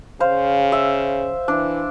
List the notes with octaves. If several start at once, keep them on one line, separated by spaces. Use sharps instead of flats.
C#3 C5 F5
E5
E3 D4